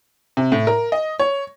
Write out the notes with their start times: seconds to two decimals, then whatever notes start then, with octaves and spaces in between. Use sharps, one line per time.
0.37 C3
0.52 A2
0.67 A#4
0.92 D#5
1.19 C#5